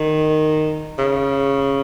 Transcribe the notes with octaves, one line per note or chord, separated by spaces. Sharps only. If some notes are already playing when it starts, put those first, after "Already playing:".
Already playing: D#3
C#3